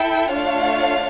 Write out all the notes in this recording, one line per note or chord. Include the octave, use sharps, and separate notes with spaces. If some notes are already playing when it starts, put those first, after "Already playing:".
Already playing: E4 A4 E5 G5
A3 D4 F4 C#5 F5